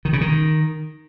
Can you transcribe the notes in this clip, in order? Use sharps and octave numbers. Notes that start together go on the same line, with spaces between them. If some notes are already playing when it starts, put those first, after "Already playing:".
D#3
C#3
D#3